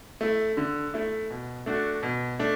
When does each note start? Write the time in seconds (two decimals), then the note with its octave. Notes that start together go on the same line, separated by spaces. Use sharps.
0.21 A3 E4
0.57 D3
0.94 A3 E4
1.30 B2
1.66 A3 D4 F#4
2.03 B2
2.39 A3 D4